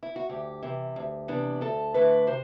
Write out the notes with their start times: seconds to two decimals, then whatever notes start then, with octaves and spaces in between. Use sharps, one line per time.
0.03 E4
0.16 F#4
0.29 D2 G4
0.63 C3 E3
0.96 D2
1.28 C3 E3 B3 D4
1.61 D2 A4
1.94 D3 A3 B4
2.27 C3 C5